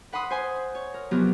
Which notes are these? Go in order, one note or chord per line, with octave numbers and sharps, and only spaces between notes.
B4 F#5 B5 C6 D#6
C5 G#5 C6
C#5
A#4
C3 F3 F#3 B3 G4 A#4